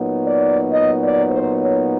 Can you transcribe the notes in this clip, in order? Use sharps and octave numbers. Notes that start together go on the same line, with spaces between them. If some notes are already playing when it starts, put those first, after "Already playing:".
Already playing: A#2 F#3 B3 D#4
D5
D#5
D5
C5
C#5